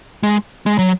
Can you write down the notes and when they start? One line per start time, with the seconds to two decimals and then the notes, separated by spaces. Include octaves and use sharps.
0.23 G#3
0.66 G#3
0.79 F#3